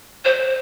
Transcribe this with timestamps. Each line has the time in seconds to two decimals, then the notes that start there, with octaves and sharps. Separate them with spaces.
0.25 C5